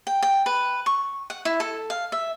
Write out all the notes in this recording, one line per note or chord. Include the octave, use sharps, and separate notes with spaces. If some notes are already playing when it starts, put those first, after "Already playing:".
G5
G5
B4
C#6
F#5
E4
A4
F5
E5